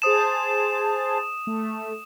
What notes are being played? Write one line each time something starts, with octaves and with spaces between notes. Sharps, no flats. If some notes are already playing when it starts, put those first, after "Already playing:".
G#4 C5 A5 D#6 E7
A3